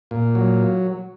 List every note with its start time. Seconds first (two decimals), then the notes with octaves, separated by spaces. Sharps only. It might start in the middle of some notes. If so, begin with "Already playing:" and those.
0.11 A#2
0.35 F#3